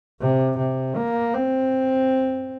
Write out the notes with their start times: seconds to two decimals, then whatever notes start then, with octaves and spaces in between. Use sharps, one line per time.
0.21 C3
0.58 C3
0.96 A#3
1.34 C4